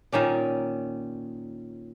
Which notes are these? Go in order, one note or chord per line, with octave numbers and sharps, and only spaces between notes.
A#2 D#3 C#4 D5